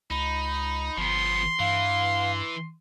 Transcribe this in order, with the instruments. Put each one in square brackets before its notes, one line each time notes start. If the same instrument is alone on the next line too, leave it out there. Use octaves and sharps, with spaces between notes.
[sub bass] C#2 [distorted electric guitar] D#4 [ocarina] B5
[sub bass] G1 [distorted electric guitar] F3 B3 [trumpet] C6
[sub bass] G2 [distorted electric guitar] E3 [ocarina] F5